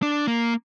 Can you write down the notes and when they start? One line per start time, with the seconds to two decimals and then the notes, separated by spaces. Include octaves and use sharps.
0.02 D4
0.27 A#3